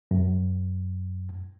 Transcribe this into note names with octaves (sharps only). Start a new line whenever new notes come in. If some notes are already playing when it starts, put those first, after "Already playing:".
F#2